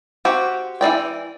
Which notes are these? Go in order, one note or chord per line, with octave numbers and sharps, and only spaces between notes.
C4 F#4 G4
E3 D#4 D5 G5